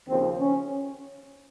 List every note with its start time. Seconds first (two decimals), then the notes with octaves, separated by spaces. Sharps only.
0.08 D#2 C#3 F3 C4
0.38 C#4